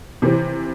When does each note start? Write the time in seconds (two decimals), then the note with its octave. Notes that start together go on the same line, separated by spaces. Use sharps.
0.22 C3 E3 C4